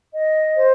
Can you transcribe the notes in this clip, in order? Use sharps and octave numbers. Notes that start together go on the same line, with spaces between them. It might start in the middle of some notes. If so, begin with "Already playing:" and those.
D#5
C5